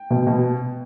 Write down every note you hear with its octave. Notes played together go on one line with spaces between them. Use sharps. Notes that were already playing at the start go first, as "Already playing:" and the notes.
Already playing: G5
B2
B2